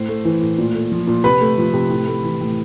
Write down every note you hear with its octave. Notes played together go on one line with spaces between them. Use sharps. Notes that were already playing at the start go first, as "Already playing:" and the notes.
Already playing: A2 C5
A3
E3
A2
A#2
A3
F3
A#2
C3 B4 B5
A3
F3
C3
A2
A3
E3
A2